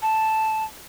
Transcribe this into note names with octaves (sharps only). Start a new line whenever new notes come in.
A5